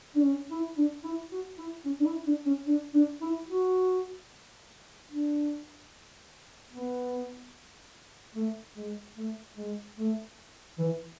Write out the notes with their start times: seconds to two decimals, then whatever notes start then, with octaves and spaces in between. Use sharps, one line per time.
0.15 D4
0.23 C#4
0.51 E4
0.77 D4
1.04 E4
1.32 F#4
1.58 E4
1.85 C#4
2.00 D4
2.05 E4
2.27 D4
2.46 C#4
2.67 D4
2.94 D4
3.21 E4
3.48 F#4
5.10 D4
6.73 B3
8.35 A3
8.76 G#3
9.16 A3
9.57 G#3
9.98 A3
10.78 E3